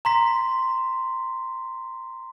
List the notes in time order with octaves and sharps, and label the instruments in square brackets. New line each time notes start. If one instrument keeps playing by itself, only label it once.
[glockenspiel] A#5 C6 B6